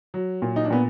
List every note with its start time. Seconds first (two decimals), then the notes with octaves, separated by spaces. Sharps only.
0.14 F#3
0.42 A#2
0.56 D#4
0.64 D4
0.70 A#2 B3